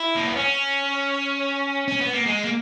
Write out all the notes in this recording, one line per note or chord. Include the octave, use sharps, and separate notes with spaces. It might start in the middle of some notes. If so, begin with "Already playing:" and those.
Already playing: E4
A#3
B3
C#4
C#4
B3
A#3
G#3
A#3